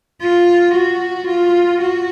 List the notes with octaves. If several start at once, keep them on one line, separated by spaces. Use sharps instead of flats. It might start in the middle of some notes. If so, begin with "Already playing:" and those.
F4
F#4
F4
F#4